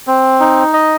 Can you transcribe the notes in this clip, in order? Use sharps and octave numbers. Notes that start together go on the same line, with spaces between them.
C4
D#4
D#5